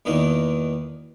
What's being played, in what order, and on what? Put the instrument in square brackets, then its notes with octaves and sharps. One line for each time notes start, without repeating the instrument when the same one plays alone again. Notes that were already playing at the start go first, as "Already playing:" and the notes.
[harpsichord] E2 B2 D#3 A#3